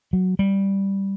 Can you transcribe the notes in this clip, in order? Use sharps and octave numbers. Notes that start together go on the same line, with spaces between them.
F#3
G3